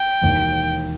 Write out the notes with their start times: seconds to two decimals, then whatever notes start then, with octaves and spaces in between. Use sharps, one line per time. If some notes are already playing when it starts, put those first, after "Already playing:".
Already playing: G5
0.21 E1 D#2 D#3